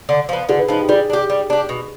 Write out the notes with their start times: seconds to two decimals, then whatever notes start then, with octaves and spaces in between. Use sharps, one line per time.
0.09 D3
0.29 F3 B3
0.49 D3 G#4
0.59 B4
0.68 F3 B3 D#4
0.80 G4
0.89 G3 G#4
1.10 D4 G4
1.30 G3
1.50 D4 G4
1.69 B2